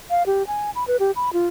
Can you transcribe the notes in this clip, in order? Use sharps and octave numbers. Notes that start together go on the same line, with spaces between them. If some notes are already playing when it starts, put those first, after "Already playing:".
F5
G4
G#5
B5
B4
G4
B5
F4